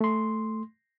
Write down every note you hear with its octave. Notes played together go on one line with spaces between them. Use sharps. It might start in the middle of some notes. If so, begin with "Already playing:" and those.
A3 C6